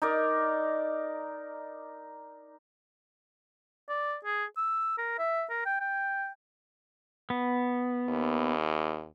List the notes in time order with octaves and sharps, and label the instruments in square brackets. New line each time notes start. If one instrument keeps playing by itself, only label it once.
[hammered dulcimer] D#4 A#4 D5
[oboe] D5
G#4
E6
A#4
E5
A#4
G5
G5
[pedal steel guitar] B3
[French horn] D#2